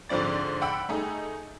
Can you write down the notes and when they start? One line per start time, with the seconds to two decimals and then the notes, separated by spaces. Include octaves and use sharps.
0.09 G#2 D3 F3 C4 D5 A6
0.62 F#5 G5 B5 E6
0.89 A3 D#4 G#4